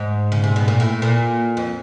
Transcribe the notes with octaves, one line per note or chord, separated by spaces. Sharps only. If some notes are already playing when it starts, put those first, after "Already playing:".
Already playing: G#2
C#3
C3
B2
A#2
A2
A#2
F2